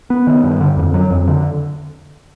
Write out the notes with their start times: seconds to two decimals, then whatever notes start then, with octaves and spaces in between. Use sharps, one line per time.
0.10 B3
0.27 D#3
0.44 G2
0.60 D3
0.77 F2
0.94 F#3
1.11 F2
1.28 D3